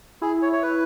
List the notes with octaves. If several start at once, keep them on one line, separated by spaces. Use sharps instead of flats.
E4 G#4
C#5
C#5
B4